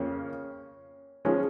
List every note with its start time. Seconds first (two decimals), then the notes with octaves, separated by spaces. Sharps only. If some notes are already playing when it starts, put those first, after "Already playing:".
Already playing: F2 C#3 A#3 C#4
1.25 F3 G#3 C#4